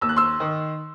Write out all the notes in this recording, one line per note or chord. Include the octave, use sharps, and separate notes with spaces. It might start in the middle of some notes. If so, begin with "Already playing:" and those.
D#2 E6
F#6
C6 E6
D#3